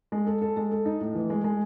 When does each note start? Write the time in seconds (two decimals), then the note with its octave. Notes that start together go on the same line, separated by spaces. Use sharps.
0.12 G#3
0.27 A4
0.42 A4
0.57 G#3
0.72 A4
0.85 D#4
1.01 A2
1.15 E3
1.30 G#3
1.44 G#3